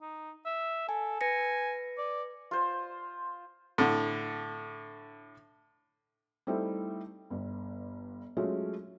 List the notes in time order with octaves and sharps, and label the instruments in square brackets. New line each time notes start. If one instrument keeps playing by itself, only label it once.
[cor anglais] D#4
E5
[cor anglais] A4 [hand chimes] G#5
[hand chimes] B4 A#6 C#7 [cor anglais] G#5
[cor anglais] D5
[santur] F4 C5
[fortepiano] A2 D3
[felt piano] G3 A3 C4 D#4 E4 A4
G1 G2
F#3 G#3 A3 C#4 F4 F#4